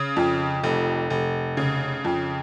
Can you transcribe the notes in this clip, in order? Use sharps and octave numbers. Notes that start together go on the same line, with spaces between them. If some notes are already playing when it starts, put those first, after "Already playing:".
Already playing: C#3
F2
F1
F1
C#3
F2